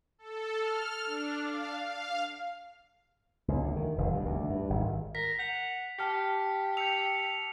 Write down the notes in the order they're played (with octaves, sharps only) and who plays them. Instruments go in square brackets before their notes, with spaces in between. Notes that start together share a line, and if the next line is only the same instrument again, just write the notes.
[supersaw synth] A4
F6
D4
F5
F5
[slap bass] C#2
D2
D#3
F1
G2
D2
G2
G#1
[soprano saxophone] A#4 [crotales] B6
[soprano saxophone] F#5 [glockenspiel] G6 F7
[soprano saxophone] G4 [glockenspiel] A5 F6 C#7
[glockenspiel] E6 G6 [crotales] C#7 F7
[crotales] C#7